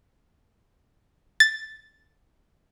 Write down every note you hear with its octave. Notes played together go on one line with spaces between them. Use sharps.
A6